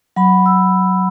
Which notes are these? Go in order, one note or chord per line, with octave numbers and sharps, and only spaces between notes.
F#3 F#5 B5
E6